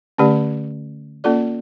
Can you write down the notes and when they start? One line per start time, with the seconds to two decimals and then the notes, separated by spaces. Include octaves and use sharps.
0.18 D3 A3 C#4 G4 D5
1.24 A#3 C#4 F4 A4 D5